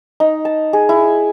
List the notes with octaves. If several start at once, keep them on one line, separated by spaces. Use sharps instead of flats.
D#4
A5
G#4
E4